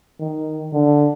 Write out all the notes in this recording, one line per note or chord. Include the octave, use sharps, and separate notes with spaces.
D#3
D3